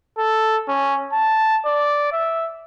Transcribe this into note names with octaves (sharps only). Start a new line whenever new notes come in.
A4
C#4
A5
D5
E5